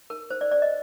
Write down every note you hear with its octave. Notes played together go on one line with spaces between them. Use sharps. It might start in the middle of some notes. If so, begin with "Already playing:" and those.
A#4
C5
D5
D5
D#5